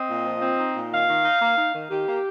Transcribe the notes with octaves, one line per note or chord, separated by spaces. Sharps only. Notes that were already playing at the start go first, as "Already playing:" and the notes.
Already playing: C4 D#5
A#2
F3
C4
D#4
A#2
D#3 F5
D#3
D#4
A#3
D#4
D#3
D#3 G4
A#3